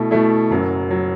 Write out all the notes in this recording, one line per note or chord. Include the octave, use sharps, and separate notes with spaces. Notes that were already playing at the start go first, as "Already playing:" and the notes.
Already playing: B2 A3 E4
B2 A3 E4
F#1 F#2 F#3
F#3